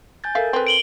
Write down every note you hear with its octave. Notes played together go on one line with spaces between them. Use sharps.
G#5 G6 A6
A4 A#4 E5 F5
C4 B4
D7 F#7 G7